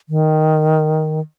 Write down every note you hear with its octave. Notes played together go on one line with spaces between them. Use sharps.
D#3